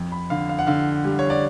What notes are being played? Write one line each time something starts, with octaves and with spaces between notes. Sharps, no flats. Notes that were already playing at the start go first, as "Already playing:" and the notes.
Already playing: F2
B5
D3 F5
F5
F#5
D3 F5
G3
C#5
D5